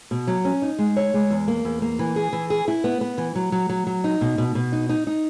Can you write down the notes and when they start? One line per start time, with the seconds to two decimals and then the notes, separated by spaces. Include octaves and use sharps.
0.11 B2
0.27 F#3
0.45 C#4
0.62 D#4
0.79 G#3
0.97 C#5
1.14 G#3
1.30 E2
1.48 A#3
1.65 E2
1.82 A#3
1.99 E3
2.16 G#4
2.33 E3
2.50 G#4
2.68 E4
2.84 B3
3.01 B3
3.18 E3
3.35 F#3
3.52 F#3
3.69 F#3
3.87 F#3
4.04 D#4
4.21 B2
4.38 B2
4.55 B2
4.72 D#4
4.89 D#4
5.07 D#4